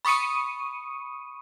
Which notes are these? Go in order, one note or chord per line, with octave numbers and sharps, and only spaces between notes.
B5 C#6 D#6 C#7 D#7